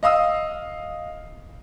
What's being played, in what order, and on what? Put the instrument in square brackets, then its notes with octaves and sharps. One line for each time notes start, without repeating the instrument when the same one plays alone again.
[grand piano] D#5 F5 D#6 E6